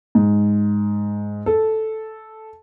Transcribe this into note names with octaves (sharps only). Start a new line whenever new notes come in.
G#2
A4